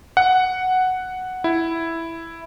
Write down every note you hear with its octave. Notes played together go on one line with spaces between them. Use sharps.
F#5
E4